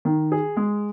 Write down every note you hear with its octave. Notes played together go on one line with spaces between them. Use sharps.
D#3
G#4
G#3